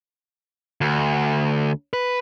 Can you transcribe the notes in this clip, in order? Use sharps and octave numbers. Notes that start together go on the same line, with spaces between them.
D2
B4